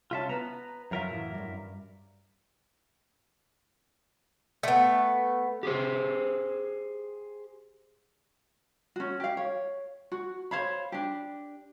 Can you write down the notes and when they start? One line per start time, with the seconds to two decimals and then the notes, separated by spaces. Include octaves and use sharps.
0.11 C2 C#4 F4 E5 A5
0.29 B3 B4 A#5
0.91 F#2 F3 F#3 F4 A#4 E5
1.10 A2 E3
1.34 G2 G3
4.63 A3 B3
5.63 G4 G#4 C5
8.96 C#4 F#4
9.20 G4 F5
9.37 C#5
10.12 F#4
10.51 C5 C#5 F5 B5
10.92 D4 G4